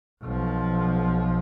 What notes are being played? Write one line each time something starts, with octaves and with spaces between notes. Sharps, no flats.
B1 F3